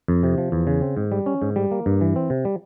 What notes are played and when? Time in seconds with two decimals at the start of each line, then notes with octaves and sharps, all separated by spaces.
0.08 F2
0.23 C3
0.38 F3
0.52 E2
0.67 C#3
0.82 C4
0.97 G#2
1.12 G3
1.26 C#4
1.42 G#2
1.56 G3
1.71 A#3
1.86 G2
2.01 E3
2.16 C4
2.30 C3
2.45 G3